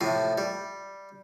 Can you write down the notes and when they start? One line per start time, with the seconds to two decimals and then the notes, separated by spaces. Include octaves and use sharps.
0.01 A2 C3 F3
0.38 G3